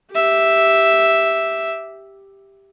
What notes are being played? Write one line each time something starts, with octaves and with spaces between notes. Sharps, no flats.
G4 E5